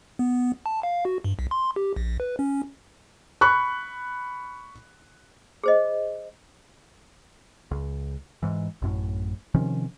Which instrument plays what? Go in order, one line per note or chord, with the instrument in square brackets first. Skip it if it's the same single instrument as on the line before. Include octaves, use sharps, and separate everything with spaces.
[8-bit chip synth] B3
A5
F5
F#4
G2
B1
C6
G4
A#1
B4
C#4
[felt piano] B5 C#6 F#6
[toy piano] G#4 C5 D#5
[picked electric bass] C#2
G#2 E3
A1 F#2 A2
C3 D#3 F3 C#4